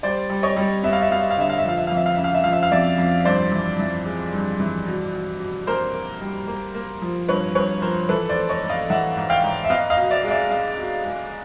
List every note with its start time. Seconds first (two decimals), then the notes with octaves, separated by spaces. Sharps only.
0.03 G3 C5 D5
0.30 G3
0.43 C#5 D#5
0.56 G3
0.83 B3 E5
0.93 F5
1.02 E5
1.11 B3 F5
1.21 E5
1.31 F5
1.38 D3 E5
1.50 F5
1.58 E5
1.65 F3 F5
1.78 E5
1.87 F2 F5
1.97 E5
2.06 F5
2.15 C#3 E5
2.24 F5
2.34 E5
2.44 F3 F5
2.53 E5
2.63 F5
2.72 F2 D5 E5
2.98 F2
3.25 G2 C5 D5
3.52 E3
3.79 E3
4.06 G#3
4.33 G2
4.60 E3
4.86 B2
5.13 B2
5.40 B2
5.67 A#3 A#4 C5
5.94 A#3
6.21 G3
6.48 A#3
6.74 A#3
7.02 F3
7.28 G2 B4 C#5
7.55 G2 B4 C#5
7.82 F3 A#4 C5
8.09 E3 A4 B4
8.29 C5 D5
8.35 A3
8.49 C#5 D#5
8.63 G#2
8.69 D#5 F5
8.90 E3 E5 F#5
9.16 G#2
9.30 F5 G5
9.43 G#2
9.64 E5
9.70 B3 D#5 F5
9.90 D#5 F5
9.97 B2
10.10 D5 E5
10.24 G#3
10.30 D5 E5
10.50 G#3 D#5 F5
10.78 B2
11.04 G#3